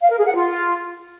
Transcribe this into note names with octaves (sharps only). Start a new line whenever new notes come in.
F5
A#4
G#4
F#5
F4